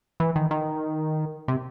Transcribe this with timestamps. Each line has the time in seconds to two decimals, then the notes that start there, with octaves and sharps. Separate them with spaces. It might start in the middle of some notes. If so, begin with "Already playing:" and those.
0.20 E3
0.36 D#3
0.51 D#3
1.48 C3